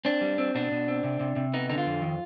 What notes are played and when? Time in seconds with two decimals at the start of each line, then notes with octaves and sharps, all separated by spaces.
0.05 C4 D4
0.21 G3
0.38 C4
0.55 B2 D4
0.72 B2
0.88 C4
1.04 C3
1.20 C3
1.36 C3
1.54 B3 D#4
1.69 D3 D#4
1.78 F4
1.86 F2
2.02 D#3